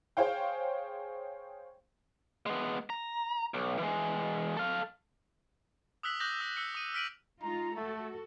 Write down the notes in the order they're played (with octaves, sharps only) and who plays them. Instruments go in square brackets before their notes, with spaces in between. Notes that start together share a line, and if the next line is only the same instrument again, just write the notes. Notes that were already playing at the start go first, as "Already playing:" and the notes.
[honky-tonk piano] G#4 C5 C#5 F5 G5
[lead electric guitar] G#3 B3
A#5
B1
E3 G#3
A4 F5
[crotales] D#6 E6 F#6 B6 F#7
D6 D#6 F#6 G6 A#6 F#7
E6
E6 F#6 C#7
D#6 D#7
F6 B6 D7 D#7 F#7
[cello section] G#3 D#4 F4 [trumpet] A#5
[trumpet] A3 [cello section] F#4 A4